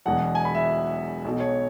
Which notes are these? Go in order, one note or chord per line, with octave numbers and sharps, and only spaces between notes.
E1 E2 B2 F#3 F#5
G#5
B5
E5
B1 B2 F#3
C#5